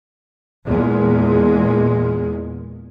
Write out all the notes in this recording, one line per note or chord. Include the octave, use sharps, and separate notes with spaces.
E2 A#2 G#3